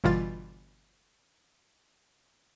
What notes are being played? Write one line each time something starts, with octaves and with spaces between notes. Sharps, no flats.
G1 B2 E3 G3 F4 A6